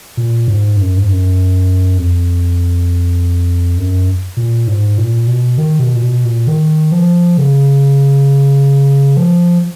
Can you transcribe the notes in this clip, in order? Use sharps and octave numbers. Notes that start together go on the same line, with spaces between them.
A#2
G#2
F#2
G#2
F#2
F2
F#2
A#2
G#2
A#2
B2
D#3
B2
A#2
B2
A#2
D#3
F3
C#3
F3